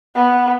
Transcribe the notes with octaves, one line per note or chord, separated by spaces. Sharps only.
B3